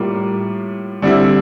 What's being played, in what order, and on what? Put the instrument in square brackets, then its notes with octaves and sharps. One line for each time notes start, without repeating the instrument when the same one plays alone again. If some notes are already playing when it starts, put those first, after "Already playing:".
Already playing: [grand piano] A2 G3 A#3 F4
D3 G3 C4 E4